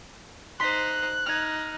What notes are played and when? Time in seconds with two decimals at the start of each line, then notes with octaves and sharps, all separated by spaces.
0.60 D#4 C5 C6 F#6 B6
1.26 D#4 F6 G#6